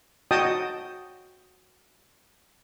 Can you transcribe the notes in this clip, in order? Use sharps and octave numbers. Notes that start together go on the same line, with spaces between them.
F#4 D#5 G5 A5 D#6